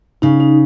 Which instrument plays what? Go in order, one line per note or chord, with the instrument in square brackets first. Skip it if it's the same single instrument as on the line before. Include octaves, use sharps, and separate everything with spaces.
[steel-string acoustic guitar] C#3 [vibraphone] D#4
[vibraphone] D#4